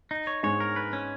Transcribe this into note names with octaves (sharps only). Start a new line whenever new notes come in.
D#4
C#5
G#2 G#3 C#5
A#4
B4
C#4